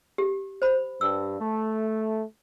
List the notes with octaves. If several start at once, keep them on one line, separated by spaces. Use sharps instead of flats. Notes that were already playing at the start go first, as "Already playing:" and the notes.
G4
C5 B5
G2 E6
A3